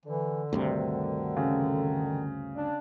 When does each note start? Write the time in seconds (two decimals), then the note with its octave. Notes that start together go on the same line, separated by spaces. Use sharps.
0.06 D3 E3
0.53 D2 G2 C3 D#3
1.37 C#3
2.55 D4